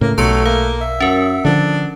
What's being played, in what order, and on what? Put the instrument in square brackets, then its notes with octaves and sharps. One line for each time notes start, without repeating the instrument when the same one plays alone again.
[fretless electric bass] A2 C#3 [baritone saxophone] A#3
[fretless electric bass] B1 [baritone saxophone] F#3 [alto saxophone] A3 [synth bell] A5 C6 C#7
[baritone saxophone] A#3 [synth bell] F5
[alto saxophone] E5
[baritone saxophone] F#2 [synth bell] C#4 A#4
[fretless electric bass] D3 D#3 F3 [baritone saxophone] D4